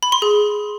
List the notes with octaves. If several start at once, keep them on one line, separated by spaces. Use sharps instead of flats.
B5
C6
G#4